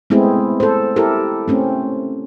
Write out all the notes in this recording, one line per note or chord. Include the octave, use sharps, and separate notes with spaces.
G#3 A3 B3 C4 E4 G#4
A4 C5
E4 G4 A4 A#4
A3 C4 C#4